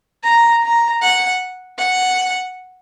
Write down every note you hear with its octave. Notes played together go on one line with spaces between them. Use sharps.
A#5
A#5
F#5
F#5